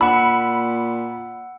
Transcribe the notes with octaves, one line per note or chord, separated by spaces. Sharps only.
A#2 F#5 B5 E6